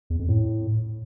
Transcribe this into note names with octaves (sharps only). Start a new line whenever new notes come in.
E2
F2
A2